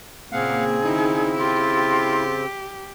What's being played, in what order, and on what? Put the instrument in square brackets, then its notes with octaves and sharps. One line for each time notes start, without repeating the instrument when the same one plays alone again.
[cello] A#2 A#3 [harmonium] C#3 C4 [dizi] G#4 [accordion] F5 F#5
[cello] D#3 D#4 [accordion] E4
[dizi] F4 [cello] G4